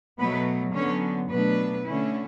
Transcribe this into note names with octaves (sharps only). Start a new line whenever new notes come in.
B2 F#3 A3 B3 B4
D3 F#3 B3 C#4 C#5
B2 F#3 A3 B3 D4 B4
D3 A3 C#4 E4